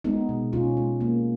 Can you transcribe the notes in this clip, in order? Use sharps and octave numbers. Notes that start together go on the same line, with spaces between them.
G#3 B3 D#4
B2
B2 C#4 F4
G#3
A#3